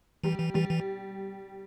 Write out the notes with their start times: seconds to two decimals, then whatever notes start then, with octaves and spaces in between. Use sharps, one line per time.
0.24 E3 G3
0.39 E3
0.54 E3 G3
0.69 E3